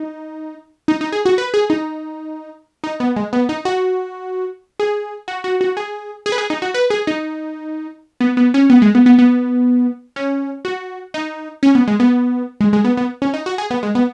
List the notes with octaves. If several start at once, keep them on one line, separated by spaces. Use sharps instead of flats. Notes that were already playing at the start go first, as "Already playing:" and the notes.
Already playing: D#4
D#4
D#4
G#4
F#4
B4
G#4
D#4
D#4
B3
G#3
B3
D#4
F#4
G#4
F#4
F#4
F#4
G#4
G#4
B4
G#4
D#4
F#4
B4
G#4
D#4
B3
B3
C#4
B3
G#3
B3
B3
B3
C#4
F#4
D#4
C#4
B3
G#3
B3
G#3
G#3
B3
B3
C#4
D#4
F#4
G#4
B3
G#3
B3